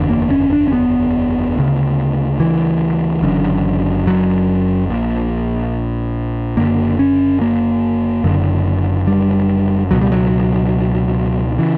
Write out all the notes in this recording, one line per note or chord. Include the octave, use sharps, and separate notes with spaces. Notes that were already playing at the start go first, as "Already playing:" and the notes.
Already playing: F#1 E2 D3
A#3
C#4
D4
C#4
B3
D2 C#3
E3
F#1 F#2 D3
F#3
A#1 A#2
F#1 F#2 D3 A#3
C#4
A#3
F#1 F#2 D3
G3
C#2 B2 F#3
G3
F#3
C#3 E3